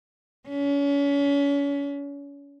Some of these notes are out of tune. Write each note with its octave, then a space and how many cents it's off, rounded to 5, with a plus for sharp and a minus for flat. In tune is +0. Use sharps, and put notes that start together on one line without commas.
C#4 +35